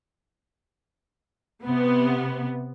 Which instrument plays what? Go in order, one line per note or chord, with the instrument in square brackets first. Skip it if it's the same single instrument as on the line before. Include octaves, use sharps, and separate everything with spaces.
[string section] C3 B3